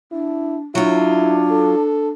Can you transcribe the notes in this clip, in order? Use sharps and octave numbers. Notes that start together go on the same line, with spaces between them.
D4 E4
F#3 D4 E4 F4
A4